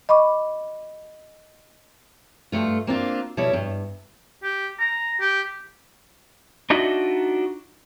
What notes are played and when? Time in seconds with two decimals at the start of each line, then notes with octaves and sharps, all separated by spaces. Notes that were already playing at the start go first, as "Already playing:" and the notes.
0.09 D#5 B5 C#6 D6
2.52 G2 A3 F4
2.87 A#3 C4 D4 F4
3.37 B2 G3 E4 C#5
3.53 G2
4.43 G4
4.79 A#5
5.20 G4
6.70 D4 D#4 F4 F#4 D#5 E5